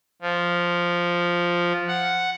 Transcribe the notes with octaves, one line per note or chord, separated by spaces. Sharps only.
F3
F#5